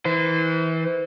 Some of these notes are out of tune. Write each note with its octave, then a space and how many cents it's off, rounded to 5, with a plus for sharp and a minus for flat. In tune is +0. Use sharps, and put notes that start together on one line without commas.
E3 -25 C5 -35